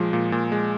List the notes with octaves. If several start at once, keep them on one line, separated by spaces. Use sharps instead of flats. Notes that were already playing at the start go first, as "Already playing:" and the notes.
Already playing: A#2 F3 G#3
A#2
A#2
G#3